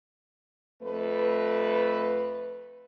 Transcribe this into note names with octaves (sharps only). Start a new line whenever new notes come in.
F2 A3 B4